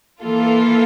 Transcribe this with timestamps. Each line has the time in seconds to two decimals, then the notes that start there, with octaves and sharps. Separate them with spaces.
0.21 E3 A#3 F4 A4